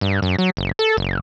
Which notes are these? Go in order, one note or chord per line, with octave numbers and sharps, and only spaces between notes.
G2
F#2
F#3
F#1
A4
F#1